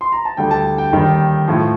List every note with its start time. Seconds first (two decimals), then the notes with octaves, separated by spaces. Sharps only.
0.01 C6
0.12 A#5
0.25 A5
0.37 D2 D3 G3 G5
0.51 A5
0.78 G5
0.93 D#2 D#3 G3
1.48 A2 F3